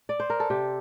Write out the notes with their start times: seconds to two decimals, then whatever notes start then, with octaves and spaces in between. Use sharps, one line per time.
0.09 D5
0.20 C5
0.30 A#4
0.40 A4
0.50 C3 G4